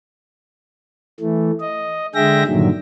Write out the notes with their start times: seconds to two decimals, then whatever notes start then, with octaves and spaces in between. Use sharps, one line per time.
1.20 E3 A3
1.60 D#5
2.15 D3 G#3 G#4 E5 G5 A#6
2.47 G2 A#2 D3 D#3 F#3